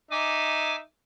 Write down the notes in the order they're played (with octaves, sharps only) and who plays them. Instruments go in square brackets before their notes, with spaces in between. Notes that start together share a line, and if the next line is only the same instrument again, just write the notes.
[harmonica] D#4 E5 [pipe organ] G#5 D6